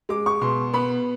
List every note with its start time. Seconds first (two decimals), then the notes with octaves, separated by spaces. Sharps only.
0.09 G#3 D6
0.26 C#6
0.41 B2 C6
0.73 B3 B5